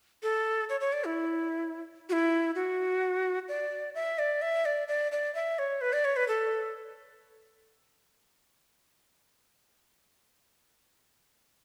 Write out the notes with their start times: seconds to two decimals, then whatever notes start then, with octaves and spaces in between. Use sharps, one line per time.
0.23 A4
0.69 C#5
0.81 C#5
0.93 D5
1.04 E4
2.09 F#4
2.13 E4
2.55 F#4
3.48 D5
3.95 E5
4.19 D5
4.42 E5
4.65 D5
4.88 D5
5.12 D5
5.35 E5
5.59 C#5
5.81 B4
5.93 D5
6.05 C#5
6.16 B4
6.28 A4